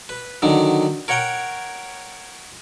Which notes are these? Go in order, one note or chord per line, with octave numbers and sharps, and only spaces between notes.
B4
D3 D#3 F#3
A#4 C#5 F#5 G5 A#5